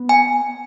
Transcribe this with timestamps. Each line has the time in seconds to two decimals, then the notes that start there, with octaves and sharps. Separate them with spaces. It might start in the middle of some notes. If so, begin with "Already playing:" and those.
Already playing: B3
0.09 G#5